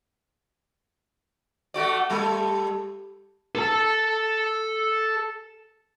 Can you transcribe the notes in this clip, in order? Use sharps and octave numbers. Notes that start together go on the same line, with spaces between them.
A3 F#4 D5
G3 G4 A4 A5
A4 A5